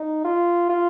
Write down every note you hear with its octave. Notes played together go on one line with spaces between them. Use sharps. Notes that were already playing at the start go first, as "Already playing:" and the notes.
Already playing: D#4
F4
F4